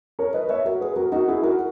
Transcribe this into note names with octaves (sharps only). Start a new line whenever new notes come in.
A#4 C#5
B4 D#5
C#5 E5
F#4 A#4
G#4 B4
F#4 A#4
D#4 F#4
E4 G#4
F#4 A#4